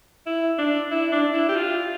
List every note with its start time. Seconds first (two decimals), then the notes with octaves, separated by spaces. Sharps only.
0.26 E4
0.59 D4
0.92 E4
1.13 D4
1.34 E4
1.49 G4
1.56 F4